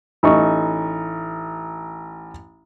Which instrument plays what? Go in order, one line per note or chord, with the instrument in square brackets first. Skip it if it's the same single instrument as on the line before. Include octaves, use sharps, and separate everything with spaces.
[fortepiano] A1 D#4 C#6